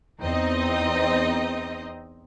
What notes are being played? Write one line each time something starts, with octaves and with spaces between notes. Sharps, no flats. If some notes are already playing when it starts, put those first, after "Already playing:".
E2 C4 D#4 D#5